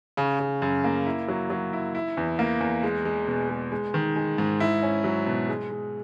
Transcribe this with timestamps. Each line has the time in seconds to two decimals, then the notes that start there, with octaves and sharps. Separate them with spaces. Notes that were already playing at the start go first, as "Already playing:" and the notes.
0.17 C#3
0.40 C#3
0.62 F#2
0.84 A#3
1.06 E4
1.28 F#3
1.50 F#3
1.73 E4
1.95 E4
2.17 E2
2.39 A#3
2.61 E2
2.83 G#3
3.05 G#3
3.28 B2
3.50 G#3
3.72 G#3
3.94 D#3
4.16 G#3
4.38 G#2
4.60 E4
4.83 C#4
5.04 F#3
5.27 B2
5.49 G#3
5.71 G#3